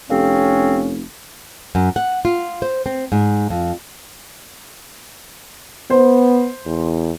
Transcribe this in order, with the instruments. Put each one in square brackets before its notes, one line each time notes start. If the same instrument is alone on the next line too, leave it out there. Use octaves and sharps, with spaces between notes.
[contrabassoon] F1 [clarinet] C4 [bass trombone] C#4 [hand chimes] G4 A4 F5
[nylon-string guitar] F#2
F#5
F4
C5
C4
G#2
F2
[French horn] B3 [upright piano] C5
[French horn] E2